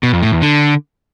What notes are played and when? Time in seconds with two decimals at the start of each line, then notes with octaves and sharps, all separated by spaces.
0.03 B2
0.13 F2
0.23 A2
0.32 E2
0.42 D3